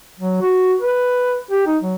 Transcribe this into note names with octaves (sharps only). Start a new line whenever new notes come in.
F#3
F#4
B4
G4
D#4
F#3